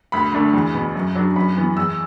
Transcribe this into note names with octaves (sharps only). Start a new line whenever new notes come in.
D2 B5
D3 A3 D4
E2
B2 B3
F#2
F#3 D4
F#2 B5
E3 B3
E2 E6